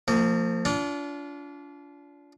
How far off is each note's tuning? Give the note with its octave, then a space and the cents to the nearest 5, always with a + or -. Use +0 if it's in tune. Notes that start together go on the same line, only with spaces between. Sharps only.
F3 +5 A#3 -40
D4 -35 F4 -10